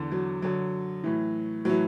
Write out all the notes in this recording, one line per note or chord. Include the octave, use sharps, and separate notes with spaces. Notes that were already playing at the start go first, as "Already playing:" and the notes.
Already playing: E2 D3
F#3
F#2 D3 F#3
A2 E3
A2 E3 F#3